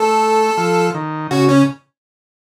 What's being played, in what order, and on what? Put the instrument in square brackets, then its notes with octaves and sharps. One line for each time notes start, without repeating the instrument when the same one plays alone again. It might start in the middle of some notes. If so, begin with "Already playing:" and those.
Already playing: [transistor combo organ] A3 [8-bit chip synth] A4
[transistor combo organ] F3
D#3
[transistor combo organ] C#3 [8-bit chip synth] F#4
[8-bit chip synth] C#4